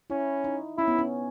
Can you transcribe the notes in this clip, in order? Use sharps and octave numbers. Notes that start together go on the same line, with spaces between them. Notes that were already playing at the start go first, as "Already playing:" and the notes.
C#4 E4
D#4
C#4 E4
B3
C#4